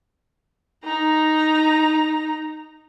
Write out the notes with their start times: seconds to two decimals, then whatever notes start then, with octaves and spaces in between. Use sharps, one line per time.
0.84 D#4 A#5